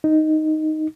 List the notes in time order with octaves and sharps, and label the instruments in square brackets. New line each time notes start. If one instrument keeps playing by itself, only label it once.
[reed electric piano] D#4